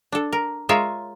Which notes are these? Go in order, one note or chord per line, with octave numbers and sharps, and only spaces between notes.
D4 A4
A#4
G#3 F4 G#4 A#4 C#5 E5